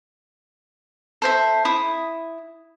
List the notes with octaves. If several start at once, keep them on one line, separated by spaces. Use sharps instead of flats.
A4 C5 E5
E4 D#6